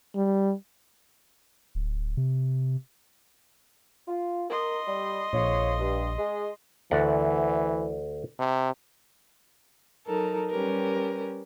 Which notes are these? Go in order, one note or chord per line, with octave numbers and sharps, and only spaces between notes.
G3
D1
C3
F4
A#4 D#5 C6
G3
A#1 F2 F4 C#5
G2
G#3
D2 E3 D5 F#5
C3
F#3 D#4 A4 A#4
G3 C#4 G4 A#4 B4